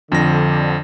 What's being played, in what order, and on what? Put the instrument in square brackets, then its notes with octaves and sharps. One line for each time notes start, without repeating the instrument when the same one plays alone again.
[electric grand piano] F2 F3 A#6 [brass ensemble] D3